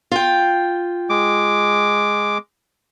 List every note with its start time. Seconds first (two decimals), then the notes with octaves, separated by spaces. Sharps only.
0.11 F4 G5
1.10 G#3 D6